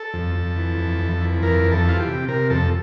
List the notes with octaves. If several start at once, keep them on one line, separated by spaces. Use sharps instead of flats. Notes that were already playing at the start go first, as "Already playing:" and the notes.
Already playing: A4
F2
F2
E3
F2
F2
E3
F2 A#4
F2
A4
E3 F4
G4
C3
C3 A#4
F2 A4